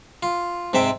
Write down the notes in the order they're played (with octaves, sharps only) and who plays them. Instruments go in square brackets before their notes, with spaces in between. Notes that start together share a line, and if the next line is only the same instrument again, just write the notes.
[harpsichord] F4
G#2 C3 E5 G5